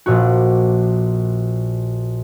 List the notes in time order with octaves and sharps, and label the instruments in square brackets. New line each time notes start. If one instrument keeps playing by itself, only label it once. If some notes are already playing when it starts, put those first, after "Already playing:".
[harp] A#1 A#2 F#4